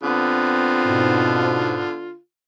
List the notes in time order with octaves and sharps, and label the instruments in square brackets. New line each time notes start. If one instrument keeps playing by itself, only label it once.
[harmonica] D3 F4 [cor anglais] B3 [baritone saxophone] C4
[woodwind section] G#2 B2